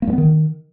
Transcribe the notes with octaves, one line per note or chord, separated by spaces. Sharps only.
A#3
G2
B3
D#3